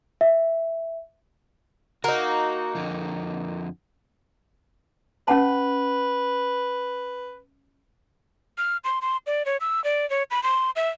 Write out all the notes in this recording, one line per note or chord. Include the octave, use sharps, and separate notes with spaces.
E5
A#3 D#4 F#4
F2 D3 F3
C#4 B4 F#5 A5
F6
C6
C6
D5
C#5
E6
D5
C#5
B5
C6
E5